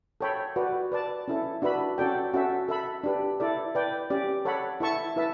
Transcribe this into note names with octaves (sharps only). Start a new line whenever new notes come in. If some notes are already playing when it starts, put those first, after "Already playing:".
A4 C#5 G5 B5
F#4 B4 D5
B4 D5 A5
C#4 E4 A4
D4 F#4 B4 E5 B5
C#4 F#4 A4 D5 G5
C#4 F#4 A4 E5
A4 E5 B5
D4 G4 B4
E4 A4 D5
B4 D5 G5
C#4 G4 D5
A4 C#5 F#5 B5
E4 A4 E5 A5 C#6
E4 B4 E5 A5